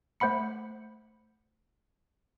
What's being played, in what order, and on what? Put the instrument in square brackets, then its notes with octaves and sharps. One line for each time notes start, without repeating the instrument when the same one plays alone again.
[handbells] A3 C5 F#5 B5 C#7